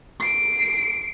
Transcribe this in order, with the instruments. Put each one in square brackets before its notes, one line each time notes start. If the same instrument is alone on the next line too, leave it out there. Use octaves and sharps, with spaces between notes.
[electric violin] C7 D7